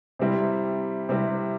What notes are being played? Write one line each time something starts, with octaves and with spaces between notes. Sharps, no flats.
C3 G3 C4 E4
C3 G3 C4 E4